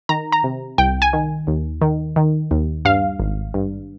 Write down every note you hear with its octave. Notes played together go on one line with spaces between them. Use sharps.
D#3 A#5
A#5
C3
C2 G5
G#5
D#3
D#2
D#3
D#3
D#2
G2 F5
G#1
G2